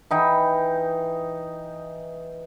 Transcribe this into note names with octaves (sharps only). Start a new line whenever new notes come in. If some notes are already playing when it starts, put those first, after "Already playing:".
E3 D#4 G5